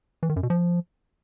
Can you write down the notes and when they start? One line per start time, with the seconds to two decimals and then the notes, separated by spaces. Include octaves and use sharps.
0.23 E3
0.29 D#3
0.36 F#2
0.43 B2
0.50 F3